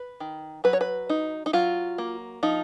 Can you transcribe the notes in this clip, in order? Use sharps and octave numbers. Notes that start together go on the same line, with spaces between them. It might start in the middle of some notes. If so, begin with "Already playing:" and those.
Already playing: B4
D#3
F#3 B4
C#5
B4
D#4
D#4
F#3 F4
A#3
F3 D#4